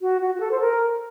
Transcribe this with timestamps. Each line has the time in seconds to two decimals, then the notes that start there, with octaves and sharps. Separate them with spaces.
0.01 F#4
0.21 F#4
0.35 F#4
0.40 A4
0.51 C5
0.60 A#4